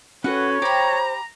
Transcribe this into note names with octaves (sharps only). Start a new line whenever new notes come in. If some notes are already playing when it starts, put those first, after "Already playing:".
C#4 F#4 A4 B4 C#5 F#5
G4 C5 A#5 B5